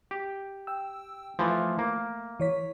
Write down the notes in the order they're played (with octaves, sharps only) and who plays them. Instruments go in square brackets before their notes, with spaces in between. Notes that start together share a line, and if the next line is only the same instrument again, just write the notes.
[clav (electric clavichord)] G4
[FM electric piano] G5 E6
[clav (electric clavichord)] E3 F3 [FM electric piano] A3
[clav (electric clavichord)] A#3
[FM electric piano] E3 C#5 B6